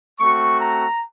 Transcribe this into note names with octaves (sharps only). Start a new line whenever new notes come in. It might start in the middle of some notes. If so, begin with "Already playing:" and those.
A3 C4 F#4 C#6
A#5